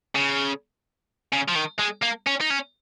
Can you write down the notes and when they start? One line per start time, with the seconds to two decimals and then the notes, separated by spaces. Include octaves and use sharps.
0.15 C#3
1.33 C#3
1.49 F3
1.56 D#3
1.80 G#3
2.03 A#3
2.27 C#4
2.41 D#4
2.50 C#4